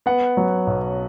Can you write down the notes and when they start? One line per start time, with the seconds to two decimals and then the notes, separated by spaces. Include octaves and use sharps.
0.06 B3 F#5
0.37 F#3
0.67 B1